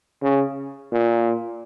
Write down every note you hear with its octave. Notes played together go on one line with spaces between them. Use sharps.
C#3
A#2